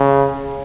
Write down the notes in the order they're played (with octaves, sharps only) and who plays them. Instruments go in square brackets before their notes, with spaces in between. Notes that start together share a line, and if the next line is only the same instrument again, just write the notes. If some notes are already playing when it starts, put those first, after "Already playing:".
Already playing: [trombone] C#3